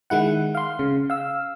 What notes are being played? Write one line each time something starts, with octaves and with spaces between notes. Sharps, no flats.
D#3 G#3 E4 F#5
F5 C6
C#3
F5 E6